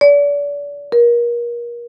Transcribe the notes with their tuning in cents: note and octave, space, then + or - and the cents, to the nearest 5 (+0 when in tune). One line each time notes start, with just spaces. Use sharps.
D5 -35
A#4 +30